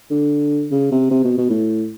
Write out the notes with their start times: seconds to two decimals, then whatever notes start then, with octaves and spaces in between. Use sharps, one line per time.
0.11 D3
0.71 C#3
0.91 C3
1.11 C3
1.24 B2
1.38 B2
1.50 A2